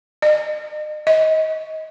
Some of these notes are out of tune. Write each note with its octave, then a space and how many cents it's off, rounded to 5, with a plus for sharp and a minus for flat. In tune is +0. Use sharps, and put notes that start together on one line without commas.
D#5 -40
D#5 +25